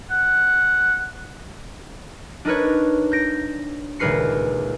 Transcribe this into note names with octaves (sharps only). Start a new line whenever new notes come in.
F#5
D4 D#4 A#4 B4 C#5
G6 A#6 D7
D#1 C#2 A#4 B4 C7 C#7